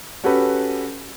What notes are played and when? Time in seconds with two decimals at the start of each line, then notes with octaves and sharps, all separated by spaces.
0.24 C#4 F#4 G4 A4 B4